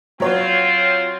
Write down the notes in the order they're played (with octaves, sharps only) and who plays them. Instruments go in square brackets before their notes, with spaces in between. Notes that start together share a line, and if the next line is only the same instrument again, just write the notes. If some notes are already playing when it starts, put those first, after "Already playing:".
[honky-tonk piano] F#3 C#5 F#5 [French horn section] C4 F4